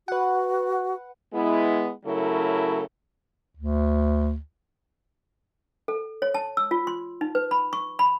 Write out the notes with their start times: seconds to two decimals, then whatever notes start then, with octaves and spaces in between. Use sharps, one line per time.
0.08 F#4 B4 F#5
1.34 G#3 B3 E4
2.06 C#3 F#3 A3 E4 A4 A#4
3.57 D2
5.88 A4
6.22 C#5
6.34 A5
6.57 E6
6.71 F4
6.87 C6
7.21 D#4
7.35 B4
7.51 B5
7.73 C#6
7.99 B5